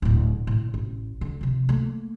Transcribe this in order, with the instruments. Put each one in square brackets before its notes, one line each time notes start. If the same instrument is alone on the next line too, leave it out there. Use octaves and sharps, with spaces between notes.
[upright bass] D1 A2
A2
A1
D3
C3 F3
A3 A#3